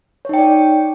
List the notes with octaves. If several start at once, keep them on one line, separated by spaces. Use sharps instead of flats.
D#4 C#5 D5 G5